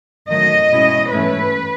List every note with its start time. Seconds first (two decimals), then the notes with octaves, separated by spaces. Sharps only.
0.30 D#3 F#3 A3 D#5
0.71 B2 G#3 C#4 E4
1.12 G#2 E3 A3 C#4 E4 B4